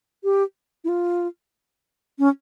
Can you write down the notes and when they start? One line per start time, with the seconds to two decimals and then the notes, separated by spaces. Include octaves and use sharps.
0.24 G4
0.84 E4
0.88 F4
2.19 C#4